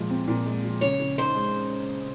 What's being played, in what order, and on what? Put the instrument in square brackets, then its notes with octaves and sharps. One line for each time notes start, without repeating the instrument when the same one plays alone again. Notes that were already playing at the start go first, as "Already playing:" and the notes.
Already playing: [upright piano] A#2 F3 G#3
C4
A#2
G#3
F3
[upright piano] C#3 [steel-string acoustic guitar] C#5
[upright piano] C#3
[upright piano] D#4 [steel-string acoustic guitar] C5
[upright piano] G#3